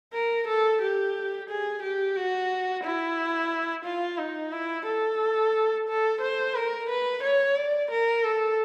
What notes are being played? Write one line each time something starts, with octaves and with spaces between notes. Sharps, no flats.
A#4
A4
G4
G#4
G4
F#4
E4
F4
D#4
E4
A4
A4
C5
A#4
B4
C#5
D5
A#4
A4